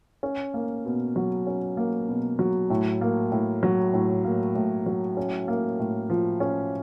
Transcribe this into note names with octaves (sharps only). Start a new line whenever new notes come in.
C#4
A#3
B2
F#3
C#4
A#3
B2
F#3
A2
A#3
A2
F#3
A2
A#3
A2
F#3
C#4
A#3
A2
F3
C#4